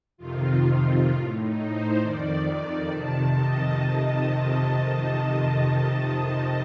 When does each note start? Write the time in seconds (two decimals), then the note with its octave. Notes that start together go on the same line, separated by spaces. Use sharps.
0.18 F2 C3 D#3 F4
1.09 A2 F4
1.40 D#4
1.69 C5
2.00 F2 D#3 D5
2.91 F2 C3 D#3 A5
3.36 D#5